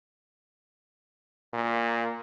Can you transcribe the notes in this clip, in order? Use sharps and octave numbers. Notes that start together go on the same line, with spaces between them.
A#2